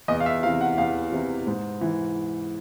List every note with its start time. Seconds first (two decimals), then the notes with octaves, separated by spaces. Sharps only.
0.08 E2 D#5
0.20 F5
0.26 E5
0.43 C3 E3 F5
0.61 F#5
0.78 E2 F5
1.12 C3 E3
1.47 G#2
1.81 E3